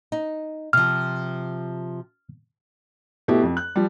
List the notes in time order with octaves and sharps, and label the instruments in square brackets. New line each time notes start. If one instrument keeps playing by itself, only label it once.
[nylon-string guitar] D#4
[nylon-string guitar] C3 F3 [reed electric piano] F6
[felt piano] B2 A3 E4 G4
F2
F#6
F3 G3